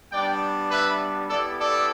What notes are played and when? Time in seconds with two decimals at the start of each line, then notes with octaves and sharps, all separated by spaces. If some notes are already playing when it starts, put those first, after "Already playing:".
0.12 G3 B3 D4 D5 G5
0.71 B4 E5
1.29 B3 E4 G4 A4 D5
1.59 A4 D5